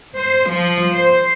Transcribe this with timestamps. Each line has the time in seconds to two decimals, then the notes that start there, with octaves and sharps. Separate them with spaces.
0.16 C5
0.49 F3
0.95 C5